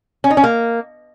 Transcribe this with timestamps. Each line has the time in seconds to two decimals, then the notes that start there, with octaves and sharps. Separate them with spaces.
0.24 C#4
0.31 D#4
0.37 C#4
0.44 A#3